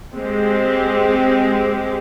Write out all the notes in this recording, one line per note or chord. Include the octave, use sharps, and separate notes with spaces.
G#3 C4 G4